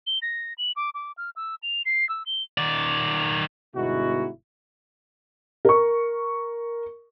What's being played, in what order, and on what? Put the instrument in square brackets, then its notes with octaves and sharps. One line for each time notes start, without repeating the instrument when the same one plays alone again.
[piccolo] G7
A#6
F#7
D6
D6
F6
E6
F7
C7
E6
G7
[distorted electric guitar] D#3 D5
[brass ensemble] G1 B2 G#3 D#4 E4 F#4
[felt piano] A#4 C#6